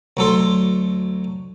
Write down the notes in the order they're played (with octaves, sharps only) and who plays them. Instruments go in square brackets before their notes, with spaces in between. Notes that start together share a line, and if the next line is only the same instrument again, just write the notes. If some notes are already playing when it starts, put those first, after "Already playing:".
[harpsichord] D2 F#3 A4 C6